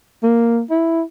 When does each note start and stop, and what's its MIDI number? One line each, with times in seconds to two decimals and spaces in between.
0.23 0.62 58
0.70 1.02 64